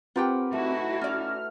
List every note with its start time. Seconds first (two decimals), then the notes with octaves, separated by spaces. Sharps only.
0.16 C4 F4 G4 A#4 B4 F#5 G5
0.53 A3 D#4 E4 F#4
1.01 C#4 D5 F6